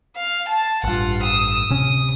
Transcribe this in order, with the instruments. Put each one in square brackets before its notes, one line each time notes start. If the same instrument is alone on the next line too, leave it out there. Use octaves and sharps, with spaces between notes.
[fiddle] F5
A5
[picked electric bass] A1 G2 [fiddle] F4 F#5
[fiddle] D#6 E6
[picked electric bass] D1 C3 C#4 [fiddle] D#6